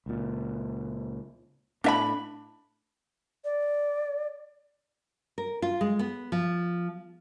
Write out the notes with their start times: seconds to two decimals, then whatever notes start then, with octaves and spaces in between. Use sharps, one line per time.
0.06 C#2 A#2
1.84 A2 D4 E5 B5
3.44 D5
5.38 A#4
5.62 F4
5.81 G#3
5.99 B3
6.32 F3